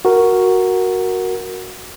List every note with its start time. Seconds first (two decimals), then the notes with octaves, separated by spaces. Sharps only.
0.05 F#4 A#4